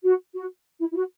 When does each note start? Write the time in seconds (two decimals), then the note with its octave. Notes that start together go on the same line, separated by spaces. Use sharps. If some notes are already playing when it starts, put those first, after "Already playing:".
0.03 F#4
0.33 F#4
0.79 E4
0.91 E4
0.95 F#4